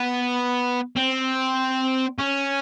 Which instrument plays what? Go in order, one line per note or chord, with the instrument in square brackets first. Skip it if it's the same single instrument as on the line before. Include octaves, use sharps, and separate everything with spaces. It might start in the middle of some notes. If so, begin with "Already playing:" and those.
Already playing: [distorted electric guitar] B3
C4
C#4